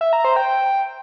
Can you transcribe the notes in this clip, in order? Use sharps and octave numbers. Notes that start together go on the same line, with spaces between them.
E5
A#5
C5
G5